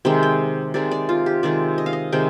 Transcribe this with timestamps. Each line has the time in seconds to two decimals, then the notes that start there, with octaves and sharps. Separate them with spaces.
0.05 C3 D#3 G#3 G5
0.23 G5
0.74 C3 D#3 G#3 D5
0.91 D5
1.09 F4
1.26 G4
1.43 C3 D#3 G#3 D5
1.78 D#5
1.86 F5
1.93 D#5
2.12 C3 D#3 G#3 G5